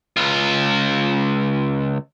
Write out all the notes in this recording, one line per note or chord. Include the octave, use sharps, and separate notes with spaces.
C#2 F4